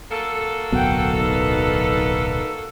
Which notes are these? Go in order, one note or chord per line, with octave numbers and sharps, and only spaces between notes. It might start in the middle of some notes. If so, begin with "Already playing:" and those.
A#3 F#4 A4
D1 B1 B2 F#5 G5
D#4 B4